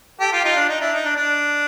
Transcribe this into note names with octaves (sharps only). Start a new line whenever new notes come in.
G4 A4
F4 G4
D#4 F4
D4
D#4
D4 E4
D#4
D4
D4